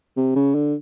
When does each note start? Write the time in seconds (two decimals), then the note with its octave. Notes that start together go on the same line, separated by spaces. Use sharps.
0.16 C3
0.36 C#3
0.55 D3